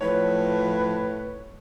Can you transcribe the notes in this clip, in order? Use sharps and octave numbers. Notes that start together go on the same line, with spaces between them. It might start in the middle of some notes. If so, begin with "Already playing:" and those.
A2 F3 B4 C#5